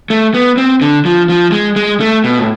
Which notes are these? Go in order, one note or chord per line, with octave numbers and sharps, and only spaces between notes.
A3
B3
C4
D3
F3
F3
G#3
G#3
A3
B2
A2